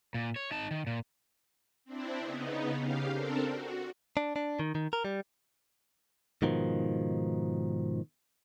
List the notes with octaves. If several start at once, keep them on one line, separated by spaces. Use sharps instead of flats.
A#2
C#5
D#4 A5
D#3
A#2
C4 D4 E4
C#3 B3 D#4
C#3 G4 F5
C4 D4 A4 A#4
F#4
D4
D4
D#3
D#3
A#4
G3
G#2 B2 D#3 F3